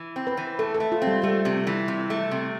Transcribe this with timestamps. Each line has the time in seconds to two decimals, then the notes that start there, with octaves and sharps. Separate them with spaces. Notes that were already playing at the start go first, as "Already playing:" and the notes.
Already playing: E3
0.16 C4
0.27 B4
0.37 E3
0.59 A3 A4
0.74 A4
0.80 A3
0.92 F4
1.02 C4
1.07 G3
1.23 G3 A3
1.45 C3
1.67 E3
1.88 C3
2.10 A3
2.31 C3